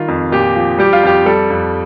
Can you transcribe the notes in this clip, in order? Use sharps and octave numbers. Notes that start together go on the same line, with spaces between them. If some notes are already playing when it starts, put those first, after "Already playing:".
Already playing: D#3 G3 F4
F2
A#2 G4
F3
G3 G4
F4
F2 G4
G3 A4
F2